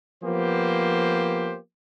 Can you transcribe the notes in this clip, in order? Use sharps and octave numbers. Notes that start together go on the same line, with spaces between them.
F3 A#3 B3 G4 C5